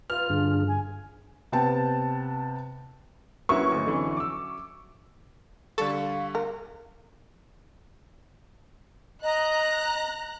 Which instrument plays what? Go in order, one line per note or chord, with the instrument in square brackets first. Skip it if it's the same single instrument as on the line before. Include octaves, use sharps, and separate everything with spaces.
[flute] F4 [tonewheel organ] B4 [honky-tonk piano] F6
[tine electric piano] G2 [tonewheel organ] D3 D4 G#4
[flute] G#5
[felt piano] C3 B3 G5 A5
[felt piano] F#3 C#4 E5 [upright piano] A#3 E4 B4 [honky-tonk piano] C#6
[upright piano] D2 G#2
F2 D3 E3
D6 E6
[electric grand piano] D3 G3 C#6 [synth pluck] A4 [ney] F5
[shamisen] A#4
[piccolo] D#5 [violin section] A#5 F#6